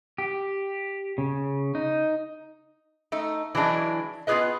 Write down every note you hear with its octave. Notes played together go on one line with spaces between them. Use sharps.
G4
C#3
D#4
A3 D#4
E3 F#3 G#3 D4 E4
B3 F4 F#4 G#4 B4 D#5